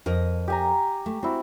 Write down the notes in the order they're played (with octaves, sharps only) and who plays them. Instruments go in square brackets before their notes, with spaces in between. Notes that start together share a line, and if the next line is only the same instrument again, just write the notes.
[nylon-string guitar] F2 A#4 D#5
[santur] G4 G#5 A#5
[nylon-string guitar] A3
[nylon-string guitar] C4 [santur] E4 F#4